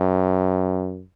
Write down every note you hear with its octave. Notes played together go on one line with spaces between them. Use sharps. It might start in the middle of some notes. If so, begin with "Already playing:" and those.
Already playing: F#2